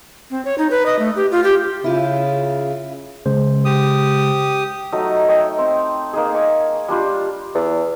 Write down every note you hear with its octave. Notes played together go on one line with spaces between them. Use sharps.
C4
C#5
D#4
B4
D#5
A3
G4
F4
G4
C#3 E4 F4
C#3 G#3 C5
G4 D#6
F#3 A3 D#4
D#4 C#5 E5 G5
C4
A#3 D#4 G#4
G#5 C#6 D6
G3 D4 F4 G4
E2